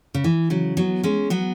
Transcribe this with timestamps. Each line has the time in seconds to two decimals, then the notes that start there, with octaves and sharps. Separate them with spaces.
0.14 C#3
0.24 E3
0.50 C#3 F#3
0.77 F#3 B3
1.03 G#3 C#4
1.30 F#3 B3